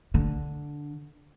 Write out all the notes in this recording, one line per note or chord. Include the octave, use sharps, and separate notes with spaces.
D3